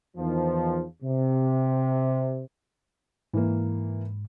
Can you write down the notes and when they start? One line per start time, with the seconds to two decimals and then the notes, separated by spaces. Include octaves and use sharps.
0.17 E2 D#3 F3
1.03 C3
3.34 G#2 E3 A#3